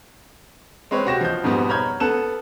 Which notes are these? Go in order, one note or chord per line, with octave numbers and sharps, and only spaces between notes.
G#3 C4 B4 C#5
C3 F#4 G4 A#6 E7
F3 D#5 G6
F2 G#2 B2 G3 B3
C#5 A#5 B5 F6 G6 G#6
B3 A4 F#6 E7